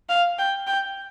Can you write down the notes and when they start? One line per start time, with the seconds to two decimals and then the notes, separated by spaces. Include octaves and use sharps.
0.09 F5
0.38 G5
0.67 G5